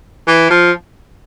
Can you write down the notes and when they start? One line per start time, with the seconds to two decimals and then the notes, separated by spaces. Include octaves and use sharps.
0.28 E3
0.50 F3